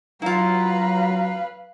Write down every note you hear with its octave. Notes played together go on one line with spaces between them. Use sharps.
F#3 E4 F4 B4 F5 A#5